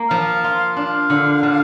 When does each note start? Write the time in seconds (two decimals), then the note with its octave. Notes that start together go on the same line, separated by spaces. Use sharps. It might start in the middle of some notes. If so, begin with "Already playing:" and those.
Already playing: A#3
0.10 F3 F5
0.44 F4
0.76 D4 F5
1.10 D3
1.43 D3